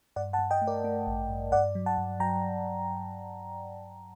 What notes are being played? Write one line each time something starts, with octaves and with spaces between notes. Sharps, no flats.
G2 D5 F#5
F#5 A5
G2
D#5 G5
A3
A#4 D5
A3
A1
G2
G2 D5 F#5
F#3
F#5 A5
G2
F#3 G5 A#5